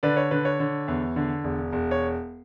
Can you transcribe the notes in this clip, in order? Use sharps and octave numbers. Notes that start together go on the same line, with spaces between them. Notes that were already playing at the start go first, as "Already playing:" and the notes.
D3 B4 D5
C#5
D3 B4
C#5
D3
E2
D3
E1
E1
C#5